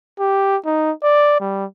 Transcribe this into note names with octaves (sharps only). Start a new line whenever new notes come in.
G4
D#4
D5
G3